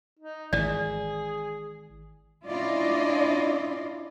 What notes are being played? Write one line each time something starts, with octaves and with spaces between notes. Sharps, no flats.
D#4
G#1 E3 G#4 D5
C#4 D4 E4 F4 D5 D#5